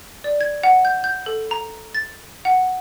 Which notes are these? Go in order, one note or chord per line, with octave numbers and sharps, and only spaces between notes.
D5
G#6
F#5
G6
G6
A4
A#5
A6
F#5